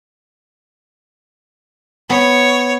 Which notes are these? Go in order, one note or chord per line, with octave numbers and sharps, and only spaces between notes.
B3 C#5